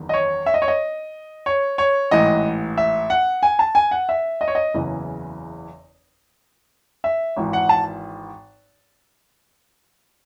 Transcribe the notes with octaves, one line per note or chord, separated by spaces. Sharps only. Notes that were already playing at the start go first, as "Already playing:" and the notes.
Already playing: F#1 E2 D#3
D#5
C#5
E5
D#5
C#5
D#5
C#5
C#5
A1 G#2 E3 D#5
E5
F#5
G#5
A5
G#5
F#5
E5
D#5
C#5
D#5
F#1 E2 C#3 E3
E5
G#1 G#2 E3
F#5
A5